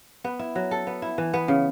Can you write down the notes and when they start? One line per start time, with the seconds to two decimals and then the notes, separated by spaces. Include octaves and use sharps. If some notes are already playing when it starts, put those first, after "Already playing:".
0.24 B3
0.39 E4
0.55 F#3
0.71 A4
0.87 B3
1.02 E4
1.18 E3
1.34 B3
1.48 C#3